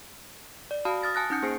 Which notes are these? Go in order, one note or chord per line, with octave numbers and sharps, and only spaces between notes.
D5
F#4 F5 A5 B5 D#6 F6
D#6 F6 A6 A#6
G#5 A5 D#6 F#6 A6 A#6
C#4 D#4 F#5 D#6 G6 C#7
A#3 G#4 C5 G#5 C7 D7